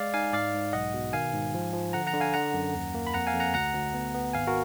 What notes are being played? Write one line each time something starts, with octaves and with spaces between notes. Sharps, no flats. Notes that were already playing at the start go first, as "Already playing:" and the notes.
Already playing: G#3 D5 F5
D#4 F5 G#5
G#2 D5 F5
G#2
B1 D#5 F#5
B2
D#3 F5 G#5
G#2
F3
F3
D3 F#5 A#5
F#5 A#5
D3
F5 G#5
D3 F#5 A#5
F#2
D#2
A#3
B5
F2 F#5 A#5
F5 G#5
F2
F#5 A#5
D2 F#5 A#5
D2
B3
B3
G#1 F5 G#5
F#4 A#4